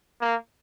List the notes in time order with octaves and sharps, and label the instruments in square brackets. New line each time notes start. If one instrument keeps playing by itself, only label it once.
[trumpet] A#3